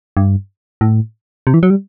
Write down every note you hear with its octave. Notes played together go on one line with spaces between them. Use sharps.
G2
A2
C3
E3
F#3
G3